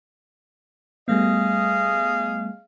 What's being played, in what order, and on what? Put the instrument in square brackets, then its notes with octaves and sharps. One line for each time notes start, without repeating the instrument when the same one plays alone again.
[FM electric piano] G3 A3 B3 [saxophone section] G#4 D#5 F5